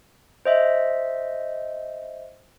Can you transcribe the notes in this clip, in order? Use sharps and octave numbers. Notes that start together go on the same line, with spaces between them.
C5 D#5 E5